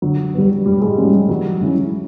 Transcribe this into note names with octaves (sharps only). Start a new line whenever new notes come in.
D3 F#3
G3 B3
B2 G3
G#2 G#3
F#3 G3 A#3 C#4
G3
E3 F#3
G#3 C#4 E4